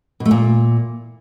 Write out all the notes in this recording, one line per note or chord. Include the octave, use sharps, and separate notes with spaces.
B2
A3
A#2